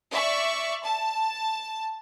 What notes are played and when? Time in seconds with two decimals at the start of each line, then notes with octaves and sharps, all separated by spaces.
0.10 D5 E5 C#6
0.84 A5